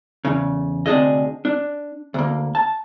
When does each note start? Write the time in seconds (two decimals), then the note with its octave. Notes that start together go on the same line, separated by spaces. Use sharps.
0.25 E2 C#3
0.86 D2 C3 F3 D4 G#4 D#5
1.45 D4
2.14 D2 A#3
2.55 A5